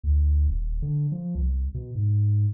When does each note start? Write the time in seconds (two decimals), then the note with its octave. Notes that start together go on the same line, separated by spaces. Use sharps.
0.03 D2
0.48 D#1
0.82 D3
1.12 F3
1.35 C2
1.74 B2
1.95 G#2